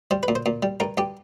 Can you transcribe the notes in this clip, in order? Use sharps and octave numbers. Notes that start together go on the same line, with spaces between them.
G3 C5
B4
A#2
C5
A#2
G3
G2 A#4
G2 G4